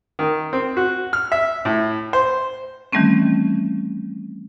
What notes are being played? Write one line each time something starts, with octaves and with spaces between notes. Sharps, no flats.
D#3
C4
F#4
F6
E5
A2
C5
D#3 E3 G3 A3 C4 C#4